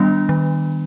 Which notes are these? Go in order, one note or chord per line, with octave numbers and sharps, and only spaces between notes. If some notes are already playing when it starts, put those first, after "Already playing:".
Already playing: D#3 G3 B3 D4
D#3